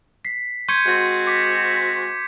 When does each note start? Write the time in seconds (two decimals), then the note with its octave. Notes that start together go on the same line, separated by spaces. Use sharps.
0.25 B6 C7
0.69 C6 C#6 G6 G#6 C#7 D#7
0.86 G#3 C4 F#4 C#7
1.27 D6 B6 C#7